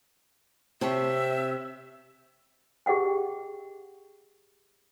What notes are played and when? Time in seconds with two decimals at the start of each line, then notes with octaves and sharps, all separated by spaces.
0.81 C3 C4 C#5 E5 A5
2.86 G4 G#4 D#5 F#5 G5